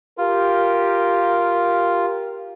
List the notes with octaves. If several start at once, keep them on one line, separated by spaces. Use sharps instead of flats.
F4 G4 A#4